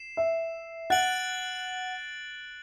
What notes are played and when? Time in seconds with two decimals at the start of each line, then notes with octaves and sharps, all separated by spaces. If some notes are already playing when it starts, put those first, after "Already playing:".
Already playing: C7 E7
0.17 E5
0.90 F#5 F#6 A6 D7 F#7